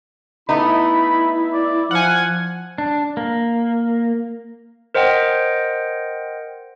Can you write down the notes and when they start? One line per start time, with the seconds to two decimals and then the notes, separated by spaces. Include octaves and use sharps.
0.49 A3 B3 D#4 E4 B5
1.53 D5
1.91 F3 F5 F#5 G#5
2.78 D4
3.17 A#3
4.95 A#4 C5 D#5 F#5 G5